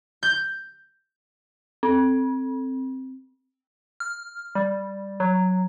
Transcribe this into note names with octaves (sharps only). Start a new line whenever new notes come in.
G6
C4
F6
G3
F#3